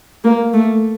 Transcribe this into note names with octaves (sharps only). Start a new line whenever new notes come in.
A#3
A3